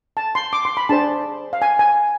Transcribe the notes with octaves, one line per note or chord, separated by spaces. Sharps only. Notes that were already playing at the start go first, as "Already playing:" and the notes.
A5
C6
D6
C6
B5
D4 G#4 C5 A5
F5
G#5
G#5